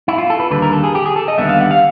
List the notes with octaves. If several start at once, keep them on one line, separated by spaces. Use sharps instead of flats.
E4
F4
A4
B4
D#2 D3 G3 B4
A#4
A4
G#4
G4
G#4
A4
D#5
D#2 D3 G3 B3 E5
F5
F#5
F5